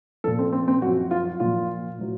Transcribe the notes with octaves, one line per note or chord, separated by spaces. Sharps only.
A#2 F3 A4
C4
C4
C4
F#2 F3 F#4
F4
A#2 F3 F4
A2 F#3